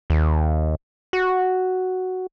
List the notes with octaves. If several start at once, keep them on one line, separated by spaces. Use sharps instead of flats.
D#2
F#4